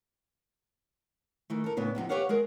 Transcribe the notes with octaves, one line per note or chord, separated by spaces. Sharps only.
D#3 E3 A3
A4 A#4
A2 C#3 B3 D4
E2 C3 F3 D#4
G4 B4 C#5 F5 F#5
G#3 G#4 A#4